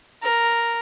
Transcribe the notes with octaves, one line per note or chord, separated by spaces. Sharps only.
A#4